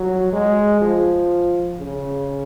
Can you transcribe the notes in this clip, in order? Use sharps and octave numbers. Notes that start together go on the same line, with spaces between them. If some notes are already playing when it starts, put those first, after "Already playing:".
Already playing: F#3
G#3
F3
C#3